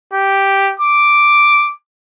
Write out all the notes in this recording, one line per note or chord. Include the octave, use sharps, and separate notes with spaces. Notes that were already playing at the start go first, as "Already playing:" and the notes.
G4
D6